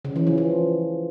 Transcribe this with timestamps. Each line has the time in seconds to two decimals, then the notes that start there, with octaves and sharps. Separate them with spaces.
0.05 C#3
0.16 E3
0.27 F3
0.38 F3